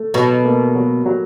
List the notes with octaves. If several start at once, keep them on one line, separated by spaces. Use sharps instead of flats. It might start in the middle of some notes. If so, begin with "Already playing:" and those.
Already playing: A3
B2 F#3
A#3
F#3
F#3